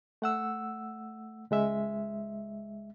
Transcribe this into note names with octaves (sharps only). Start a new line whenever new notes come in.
A3 F#5 E6
C#2 G#3 E5